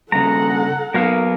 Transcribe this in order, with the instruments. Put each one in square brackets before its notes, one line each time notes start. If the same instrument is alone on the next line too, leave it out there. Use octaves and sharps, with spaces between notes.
[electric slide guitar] G2 C#3 [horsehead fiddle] A4 F#5 [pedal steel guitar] A#5
[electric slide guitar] F#3 B3 [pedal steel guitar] A#3 A#4 F5